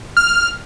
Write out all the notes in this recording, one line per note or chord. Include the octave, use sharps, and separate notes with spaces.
F6